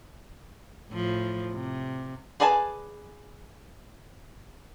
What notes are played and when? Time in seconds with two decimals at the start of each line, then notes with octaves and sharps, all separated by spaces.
0.90 A2 F3
1.52 C3
2.40 G#4 B4 D5 G#5 A5